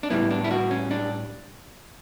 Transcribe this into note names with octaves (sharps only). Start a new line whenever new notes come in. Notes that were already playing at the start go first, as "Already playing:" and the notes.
D4
A2 G3 B3 E4
D4
E4
F#4
C#4
D4